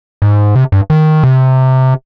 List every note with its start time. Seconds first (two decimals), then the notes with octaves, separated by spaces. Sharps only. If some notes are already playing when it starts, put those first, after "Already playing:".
0.22 G#2
0.55 C3
0.72 G2
0.90 D#3
1.23 C3